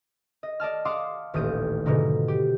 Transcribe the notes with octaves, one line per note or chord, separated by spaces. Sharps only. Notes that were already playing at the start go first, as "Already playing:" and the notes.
D#5
D5 D#5 A5 F6
F5 F#5 A5 C6 D6 D#6
D#1 A1 D#6 G6 D#7
G#2 B2 D3 F3 D#4
G4